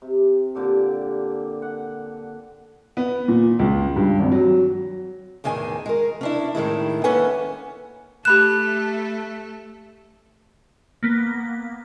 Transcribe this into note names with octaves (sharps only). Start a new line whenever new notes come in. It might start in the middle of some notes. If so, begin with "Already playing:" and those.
C3
A#2 D3 G4 A4
F#5
B3
A#2
C#2
G2
G#1
F#3
E2 A2 D#3 G#4 G#5
G#3 A#4
C#4 D4 E4
A2 D#3 G#3 E4
A#3 C#4 A4 B4 F#5 G#5
A3 G4 A4 B5 F#6 E7
A#3 B3